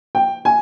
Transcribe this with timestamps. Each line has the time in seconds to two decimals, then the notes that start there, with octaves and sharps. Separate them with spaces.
0.15 G5
0.45 G#5